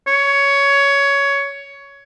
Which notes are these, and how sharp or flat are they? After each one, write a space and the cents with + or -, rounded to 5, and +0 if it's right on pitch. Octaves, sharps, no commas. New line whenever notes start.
C#5 +15